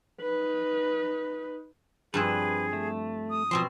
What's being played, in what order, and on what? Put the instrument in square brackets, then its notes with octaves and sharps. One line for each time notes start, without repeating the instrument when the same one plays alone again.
[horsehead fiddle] D#4 B4
[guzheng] G2 F3 C4 [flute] G#4 [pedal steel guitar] B4
[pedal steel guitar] A3
[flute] D#6
[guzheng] B2 C4 C6 [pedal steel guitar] F3